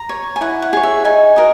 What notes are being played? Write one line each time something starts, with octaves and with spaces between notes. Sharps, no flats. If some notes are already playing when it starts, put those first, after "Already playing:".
Already playing: A#5
C#5
G#5
E4 F#5
F#5
G#4 C#5
E5
D#4 G#5
F#4 A#4 D#5